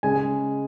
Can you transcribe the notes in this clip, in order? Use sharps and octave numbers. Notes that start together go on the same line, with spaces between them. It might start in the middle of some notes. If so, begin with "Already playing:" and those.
C#3 G#3 G#5